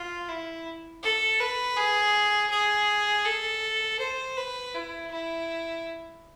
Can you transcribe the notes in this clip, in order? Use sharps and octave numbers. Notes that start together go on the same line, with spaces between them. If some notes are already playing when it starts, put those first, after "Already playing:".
Already playing: F4
E4
A4
B4
G#4
G#4
A4
C5
B4
E4
E4